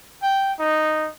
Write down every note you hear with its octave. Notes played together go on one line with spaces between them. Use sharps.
G5
D#4